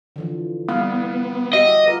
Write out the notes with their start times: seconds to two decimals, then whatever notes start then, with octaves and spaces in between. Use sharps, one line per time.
0.16 D3 E3 F3
0.68 G3 B3 E4 F5
1.53 F#4 G4 D#5 E5
1.86 F4 A#4 B4